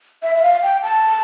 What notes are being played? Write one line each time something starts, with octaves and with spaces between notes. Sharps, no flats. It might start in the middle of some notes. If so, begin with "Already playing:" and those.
E5
E5
F5
G5
A5